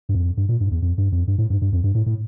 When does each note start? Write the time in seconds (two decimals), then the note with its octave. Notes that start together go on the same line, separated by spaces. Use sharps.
0.09 G2
0.15 F2
0.37 G2
0.49 A#2
0.60 G2
0.71 E2
0.82 F2
0.98 G2
1.12 F2
1.28 G2
1.38 A2
1.50 G2
1.62 G2
1.72 F2
1.84 G2
1.95 A2
2.06 A2